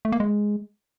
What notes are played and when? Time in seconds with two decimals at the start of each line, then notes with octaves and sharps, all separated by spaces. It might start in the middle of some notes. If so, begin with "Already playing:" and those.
0.05 A3
0.12 A#3
0.20 G#3